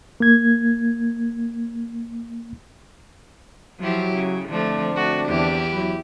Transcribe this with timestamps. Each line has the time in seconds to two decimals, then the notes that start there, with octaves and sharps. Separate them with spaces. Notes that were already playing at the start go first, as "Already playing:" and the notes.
0.20 A#3 G#6
3.80 F3 F#3 E4 G4
4.15 C#3
4.49 D3 F3 A3 C4 D4
4.95 A3 F#4
5.28 E2 E4 G4
5.71 F#3 B4